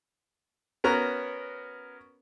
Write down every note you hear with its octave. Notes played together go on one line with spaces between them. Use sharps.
B3 C#4 F#4 A#4 A#5